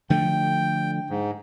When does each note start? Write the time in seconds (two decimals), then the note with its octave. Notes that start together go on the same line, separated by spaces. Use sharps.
0.10 D3 F3 A3 G5
1.10 G#2